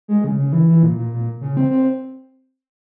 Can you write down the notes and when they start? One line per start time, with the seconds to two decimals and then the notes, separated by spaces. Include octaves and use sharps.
0.08 G#3
0.24 C#3
0.39 C#3
0.53 E3
0.68 E3
0.83 A#2
0.97 A#2
1.13 A#2
1.41 C#3
1.57 C4
1.71 C4